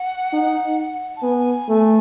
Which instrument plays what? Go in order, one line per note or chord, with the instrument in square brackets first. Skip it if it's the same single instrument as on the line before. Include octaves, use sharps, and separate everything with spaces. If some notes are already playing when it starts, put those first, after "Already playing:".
Already playing: [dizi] F#5
[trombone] D#4
[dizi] A5
[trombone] B3 [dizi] G#5
[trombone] A3